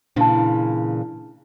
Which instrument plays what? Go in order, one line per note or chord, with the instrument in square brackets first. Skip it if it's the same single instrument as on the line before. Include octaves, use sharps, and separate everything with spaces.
[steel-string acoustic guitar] A#2 C#3 E3 [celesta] D4 A5